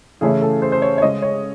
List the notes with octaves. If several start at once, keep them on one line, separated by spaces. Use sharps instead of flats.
C#3 E3 A3 C#4 E4 G#4
A4
C5
C5
C#5
C#5
C#3 G#3 C#4 D#5
C#5